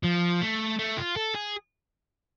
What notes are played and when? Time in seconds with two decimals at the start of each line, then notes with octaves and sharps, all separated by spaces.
0.04 F3
0.42 A3
0.79 A3
0.97 F4
1.17 A4
1.35 G#4